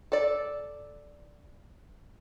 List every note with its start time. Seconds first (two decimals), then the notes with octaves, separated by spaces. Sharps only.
0.12 A4 D5